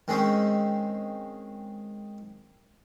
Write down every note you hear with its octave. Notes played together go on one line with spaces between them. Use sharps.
D#3 G#3 C4 C#4